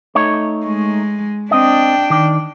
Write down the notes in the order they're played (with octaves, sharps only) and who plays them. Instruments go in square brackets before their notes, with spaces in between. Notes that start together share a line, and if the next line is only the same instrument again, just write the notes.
[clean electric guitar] A3 D#4 C#5
[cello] G#3
[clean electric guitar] C4 D#5 [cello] D4 G5
[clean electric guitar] D#3 D5